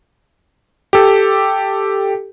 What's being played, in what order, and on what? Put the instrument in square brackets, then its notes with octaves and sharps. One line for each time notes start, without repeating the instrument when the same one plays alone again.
[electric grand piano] G4 A4